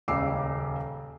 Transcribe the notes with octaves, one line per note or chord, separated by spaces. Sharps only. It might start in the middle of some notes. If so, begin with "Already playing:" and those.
D#1 C#2 C#3 D6 E6 C7